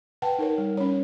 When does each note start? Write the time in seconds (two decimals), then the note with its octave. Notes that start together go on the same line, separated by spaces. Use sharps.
0.22 B4 F#5 G5 A5
0.39 D#4 A#4 C#5
0.58 G3
0.77 C#4 C#5